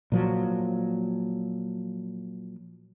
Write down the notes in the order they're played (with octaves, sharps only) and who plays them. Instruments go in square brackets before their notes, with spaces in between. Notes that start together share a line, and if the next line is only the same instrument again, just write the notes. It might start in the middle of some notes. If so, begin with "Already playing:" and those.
[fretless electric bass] A#2 F3 F#3